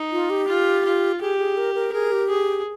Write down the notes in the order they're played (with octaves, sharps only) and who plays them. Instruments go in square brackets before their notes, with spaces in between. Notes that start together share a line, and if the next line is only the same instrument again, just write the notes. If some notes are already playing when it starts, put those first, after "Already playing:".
Already playing: [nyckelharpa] D#4
[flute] F4
G4
[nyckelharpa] F4
F4
[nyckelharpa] G4 [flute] G#4
[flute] G#4
A#4
A#4
[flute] G#4 [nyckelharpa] A#4
[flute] G4
[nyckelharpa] G#4